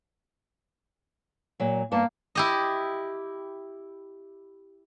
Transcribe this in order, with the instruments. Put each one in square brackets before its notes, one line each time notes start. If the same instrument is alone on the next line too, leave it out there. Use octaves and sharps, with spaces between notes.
[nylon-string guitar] A#2 F#3
[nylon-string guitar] G2 B3 A5 [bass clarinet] A#3
[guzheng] E4 G4 D#5